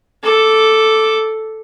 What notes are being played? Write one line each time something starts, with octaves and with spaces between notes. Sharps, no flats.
A4 D6